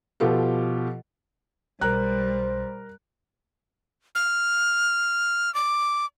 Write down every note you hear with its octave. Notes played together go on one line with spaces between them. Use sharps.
B2 F3 F4 G4 A4
B1 G3 A#4 C5 A#5 F#6
F6
D6